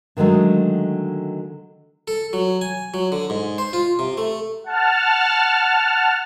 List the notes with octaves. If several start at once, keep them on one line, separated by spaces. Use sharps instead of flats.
D3 D#3 F#3 G#3 A3
A4
F#3
G#5
F#3
D3
G#2
C5
F4
C3
A3
F#5 A5 F6